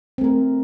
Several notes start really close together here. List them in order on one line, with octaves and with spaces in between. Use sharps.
C4 A3 A#4